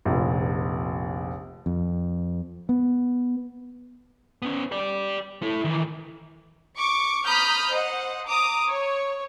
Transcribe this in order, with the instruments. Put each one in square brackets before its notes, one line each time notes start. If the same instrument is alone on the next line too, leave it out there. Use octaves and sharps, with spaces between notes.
[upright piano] F1 A#1
[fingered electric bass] F2
B3
[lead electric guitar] B3 C#4
G4 D5
E4 A4
D#3 E3
[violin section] C#6 D6
A#5 B5 D#6 F6 G6
C5 D#5 F#5
A#5 D6 D#6
C#5